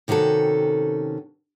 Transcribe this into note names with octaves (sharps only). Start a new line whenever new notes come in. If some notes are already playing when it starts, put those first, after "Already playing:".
C3 D#3 C#4 F#4 A4